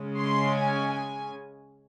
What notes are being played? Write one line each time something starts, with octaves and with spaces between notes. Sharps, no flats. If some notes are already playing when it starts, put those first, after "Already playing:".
Already playing: C#3 G#3 C#4
C6
G#5
G#5